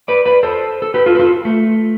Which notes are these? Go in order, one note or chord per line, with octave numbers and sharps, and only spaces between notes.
B4 D5
B4 D5
A4 C5
A4
G4 B4
F4 A4
B4
F4 A4
A3